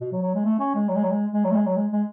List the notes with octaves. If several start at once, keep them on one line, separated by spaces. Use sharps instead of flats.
B2
F#3
F#3
G#3
A3
C#4
G#3
F#3
G#3
F#3
G#3
G#3
F#3
A3
G#3
F#3
G#3
G#3